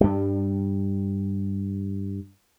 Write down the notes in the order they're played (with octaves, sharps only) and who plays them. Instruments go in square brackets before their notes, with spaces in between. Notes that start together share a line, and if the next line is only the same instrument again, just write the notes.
[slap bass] G2 G3